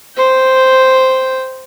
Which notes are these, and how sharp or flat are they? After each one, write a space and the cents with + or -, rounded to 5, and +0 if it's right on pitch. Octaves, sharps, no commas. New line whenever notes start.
C5 -5 G5 +0